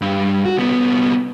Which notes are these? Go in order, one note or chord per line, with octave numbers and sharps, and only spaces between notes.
G2
F#4
C2 B3